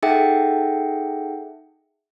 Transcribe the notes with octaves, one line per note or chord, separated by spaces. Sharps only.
D#4 G#4 A4 E5 F#5 G5